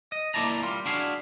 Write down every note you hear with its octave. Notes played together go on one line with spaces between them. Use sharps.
D#5
A#3 B3 E4 D5 A5 A#5
G3 F4
D4 E4 F#4 G#4 F5